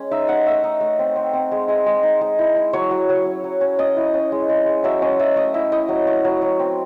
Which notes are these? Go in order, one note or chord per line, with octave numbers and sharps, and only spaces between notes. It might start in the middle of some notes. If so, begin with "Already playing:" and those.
Already playing: G#3 C#4
D#4 E5
D#4 F#5
A3 E5
D#4
A3
C4
C4
C4
G#3
G#3 D#5
G#3
D#4
G#3
E4
E4
F#3 C#5
F#3
F#3
C#4
F#3
C#4
C#4 D#5
E4
C#4
G#3
G#3
G#3
F#3 E5
C#4 D#5
F#3 E5
A3 D#5
E4 E5
E4 D#5
F#3
A3
F#3
F#3
C4